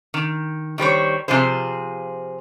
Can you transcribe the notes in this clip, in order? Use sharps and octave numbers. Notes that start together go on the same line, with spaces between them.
D#3
D#3 G3 C5 C#5
C3 F3 F4 G#4 C5